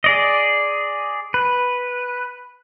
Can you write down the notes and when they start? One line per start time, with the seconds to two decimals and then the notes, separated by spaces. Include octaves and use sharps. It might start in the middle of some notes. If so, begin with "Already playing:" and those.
0.04 G#4 D5 D#5
1.34 B4